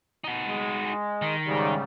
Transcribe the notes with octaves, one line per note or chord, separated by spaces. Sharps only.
D#4 F#4
G#3
D#3
G#2 C#3 G3